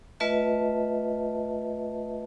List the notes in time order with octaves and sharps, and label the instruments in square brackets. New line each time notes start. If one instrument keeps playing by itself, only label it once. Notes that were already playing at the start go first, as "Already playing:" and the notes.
[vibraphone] A3 F4 B4 D#5 E5 A5